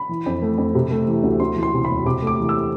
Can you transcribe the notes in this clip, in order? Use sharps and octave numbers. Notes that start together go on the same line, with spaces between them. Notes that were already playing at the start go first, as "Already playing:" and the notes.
Already playing: B5
E3
F2
A3
F2
C3
A3
E3
D2
D2 C6
E3
C6
C3
E1 B5
C3 D6
A3 D6
E3
E6